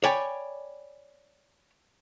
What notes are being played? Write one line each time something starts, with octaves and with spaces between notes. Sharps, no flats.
C#5 D5 G5 G#5 B5